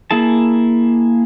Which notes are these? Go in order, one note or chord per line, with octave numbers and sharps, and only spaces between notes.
A#3 E4 G#4 A5